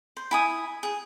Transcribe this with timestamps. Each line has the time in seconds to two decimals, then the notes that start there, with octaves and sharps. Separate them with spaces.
0.17 C5
0.31 E4 G#5 D#6
0.83 G#4